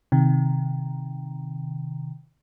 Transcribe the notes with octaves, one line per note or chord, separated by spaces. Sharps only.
C3 D#3